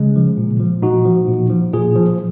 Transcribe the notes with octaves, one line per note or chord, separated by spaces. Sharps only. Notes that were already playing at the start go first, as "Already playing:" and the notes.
Already playing: C#3 G#3
F3
A#2
F3
A#2 D#4 F#4
F3
A#2
F3
A#2 F4 G#4
F3